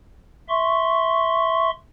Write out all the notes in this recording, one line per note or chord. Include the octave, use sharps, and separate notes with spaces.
E5 C6 C#6